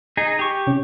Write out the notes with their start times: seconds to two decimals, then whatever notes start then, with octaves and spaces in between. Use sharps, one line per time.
0.17 D#4 G#4
0.39 G4 C#6
0.67 C3 C#4